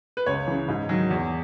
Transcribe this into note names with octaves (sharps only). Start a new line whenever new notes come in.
B4
C#2 C#5
C#3 E3
G#2
D#3 F#3
E2